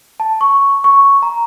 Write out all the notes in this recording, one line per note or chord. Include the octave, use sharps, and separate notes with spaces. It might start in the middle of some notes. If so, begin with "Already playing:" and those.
A5
C#6
C#6
A#5